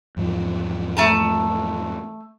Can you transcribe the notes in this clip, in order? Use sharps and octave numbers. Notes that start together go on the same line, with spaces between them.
E2 G#2 F3
A3 A5 A#5